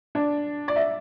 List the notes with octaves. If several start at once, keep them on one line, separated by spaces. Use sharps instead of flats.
D4
D5
E5